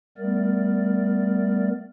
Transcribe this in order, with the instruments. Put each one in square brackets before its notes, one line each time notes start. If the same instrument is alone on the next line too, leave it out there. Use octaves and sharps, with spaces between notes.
[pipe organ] G3 A3 B3 A#4 D5